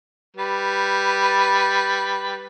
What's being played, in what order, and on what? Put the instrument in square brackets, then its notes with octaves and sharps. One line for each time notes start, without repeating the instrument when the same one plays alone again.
[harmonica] G3 B4